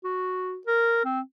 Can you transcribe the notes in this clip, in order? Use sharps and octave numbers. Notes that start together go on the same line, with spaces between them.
F#4
A#4
C4